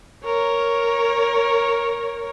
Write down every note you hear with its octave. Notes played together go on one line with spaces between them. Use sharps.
A#4 C#5